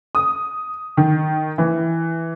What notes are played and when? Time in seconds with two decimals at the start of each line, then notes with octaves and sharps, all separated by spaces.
0.15 D#6
0.97 D#3
1.58 E3